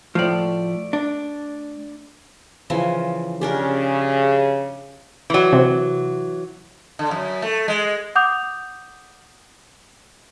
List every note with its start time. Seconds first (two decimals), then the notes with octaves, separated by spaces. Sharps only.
0.15 A2 F3 A3 D5
0.93 D4
2.70 C#3 E3 F3
3.41 C#3 C#4 D4 G4 A#4
5.30 E3 F#3
5.53 C3
6.99 D3
7.11 F#2
7.42 A3
7.68 G#3
8.15 F#5 D6 D#6 G6 F7